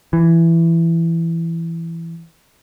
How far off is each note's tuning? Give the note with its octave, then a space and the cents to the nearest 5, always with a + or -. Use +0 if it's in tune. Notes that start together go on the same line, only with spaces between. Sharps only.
E3 +15